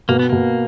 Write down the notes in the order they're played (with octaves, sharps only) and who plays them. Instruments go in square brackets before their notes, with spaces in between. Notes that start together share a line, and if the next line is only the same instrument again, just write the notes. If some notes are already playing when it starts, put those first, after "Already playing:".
[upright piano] B2 [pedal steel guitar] A#3
[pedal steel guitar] B3
[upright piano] B2 [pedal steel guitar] A#3